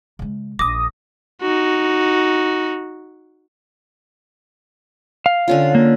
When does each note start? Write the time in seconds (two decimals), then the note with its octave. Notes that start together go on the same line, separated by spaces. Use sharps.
0.19 C#3 G#3
0.59 A#1 D#4 D6 D#6 A#6
1.42 D#4 F#4
5.26 F5
5.48 D3 C#4 F4
5.75 A#3